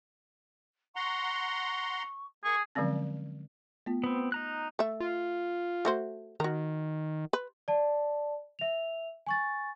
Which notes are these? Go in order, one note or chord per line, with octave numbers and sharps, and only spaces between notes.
F#5 A#5 C6 C#6
A#3 G#4 C#6
D3 F3 F#3 G#3 C4 C#4
A3 B3 F4
B3 C4 B5
D#4 A#5 F#6
A3 E5
F4
A3 F#4 C5
D#3 F#4 A#4
B4
D5 A5
E5 F7
G#5 C#6 A6